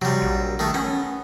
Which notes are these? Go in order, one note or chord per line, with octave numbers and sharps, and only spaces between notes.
C3 F#3 G3
A#1
D#3 A3
B3 C#4